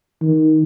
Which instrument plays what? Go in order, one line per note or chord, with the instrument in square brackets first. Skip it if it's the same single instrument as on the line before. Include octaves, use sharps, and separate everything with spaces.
[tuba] D#3